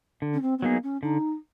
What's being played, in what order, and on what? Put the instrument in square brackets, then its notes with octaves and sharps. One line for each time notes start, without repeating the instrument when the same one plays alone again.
[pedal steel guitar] D3
[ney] C#4
C4
C4
[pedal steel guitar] F#3 A#3 D#4 G#4 [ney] B3
[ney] C#4
[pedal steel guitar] D3 [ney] D#4